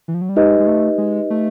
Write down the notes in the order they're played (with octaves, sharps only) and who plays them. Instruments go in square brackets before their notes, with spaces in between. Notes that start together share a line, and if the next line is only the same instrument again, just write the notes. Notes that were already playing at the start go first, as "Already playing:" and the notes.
[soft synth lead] E3
F3
F#3
G3
[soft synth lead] G#3 [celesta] D#4 G4 B4 D#5
[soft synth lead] G#3
A3
G#3
A3